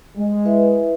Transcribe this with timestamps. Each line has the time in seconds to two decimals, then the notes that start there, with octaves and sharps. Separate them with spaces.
0.16 G#3
0.45 E4 B4 E5